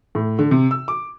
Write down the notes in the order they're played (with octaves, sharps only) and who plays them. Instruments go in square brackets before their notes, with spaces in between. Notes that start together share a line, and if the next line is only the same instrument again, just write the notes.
[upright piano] A2
D3
C3
E6
D6